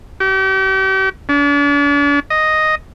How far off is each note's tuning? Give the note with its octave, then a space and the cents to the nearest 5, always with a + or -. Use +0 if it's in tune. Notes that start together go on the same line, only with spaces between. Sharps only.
G4 -40
D4 -40
D#5 +0